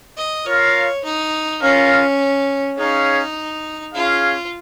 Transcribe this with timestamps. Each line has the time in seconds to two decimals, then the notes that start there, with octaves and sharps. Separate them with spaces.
0.17 D#5
0.46 F4 A#4 C#5 F5
1.04 D#4
1.62 C#4 F4 A#4 F5
2.78 C#4 D#4 G#4 C#5 F5
3.93 C#4 F4 G#4 F5